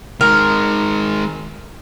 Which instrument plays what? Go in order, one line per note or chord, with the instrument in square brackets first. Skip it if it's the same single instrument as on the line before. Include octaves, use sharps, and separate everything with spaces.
[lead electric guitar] D#3 G#3 [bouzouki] A#4